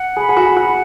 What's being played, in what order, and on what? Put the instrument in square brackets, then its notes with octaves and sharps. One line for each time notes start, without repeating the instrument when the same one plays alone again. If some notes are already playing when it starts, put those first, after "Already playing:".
Already playing: [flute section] F#5
[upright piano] G#4 [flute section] B5
[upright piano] G#4
F#4
[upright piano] F#4 [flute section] F#5